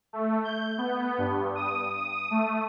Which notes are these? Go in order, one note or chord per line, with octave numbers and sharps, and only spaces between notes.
A3
G6
B3
G2
D#6
D#6
A3